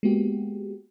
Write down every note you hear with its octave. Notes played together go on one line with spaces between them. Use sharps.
G#3 A#3 B3 F#4 G4